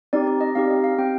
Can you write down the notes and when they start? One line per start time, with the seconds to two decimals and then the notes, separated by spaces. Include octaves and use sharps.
0.13 C4 D#4 G4 D5
0.27 D5
0.41 D#5
0.55 C4 D#4 G4 F5
0.70 D#5
0.84 F5
0.98 C4 G4 G5